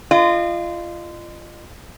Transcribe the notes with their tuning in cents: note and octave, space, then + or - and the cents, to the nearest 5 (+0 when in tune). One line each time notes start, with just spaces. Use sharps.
F4 -25 D#5 -35